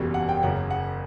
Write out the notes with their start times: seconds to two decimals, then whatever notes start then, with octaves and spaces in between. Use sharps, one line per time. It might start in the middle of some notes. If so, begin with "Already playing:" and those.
Already playing: F#1 E2 B2 G3
0.14 F#5
0.29 G5
0.43 F#1 F#2 C#3 F#5
0.71 F#5